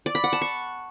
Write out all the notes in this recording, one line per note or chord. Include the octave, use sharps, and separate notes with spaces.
D5
B5
F#5
A5
C#6